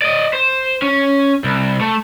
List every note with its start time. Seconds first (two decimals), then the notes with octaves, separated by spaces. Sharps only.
0.02 D5 D#5
0.33 C5
0.82 C#4
1.44 C2
1.80 A3